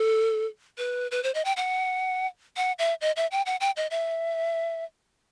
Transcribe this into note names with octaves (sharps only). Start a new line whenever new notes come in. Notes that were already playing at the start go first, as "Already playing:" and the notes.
Already playing: A4
B4
B4
C5
D#5
G5
F#5
F#5
E5
D#5
E5
G5
F#5
G5
D#5
E5